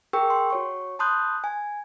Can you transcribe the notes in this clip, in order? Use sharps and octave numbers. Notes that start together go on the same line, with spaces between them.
G#4 A#4 G5 C#6 E6
C6
F#4 C#5 C#6
A5 B5 C6 D#6 F#6 G6
G#5